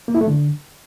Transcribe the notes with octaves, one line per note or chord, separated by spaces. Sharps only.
A#3
E4
A3
D3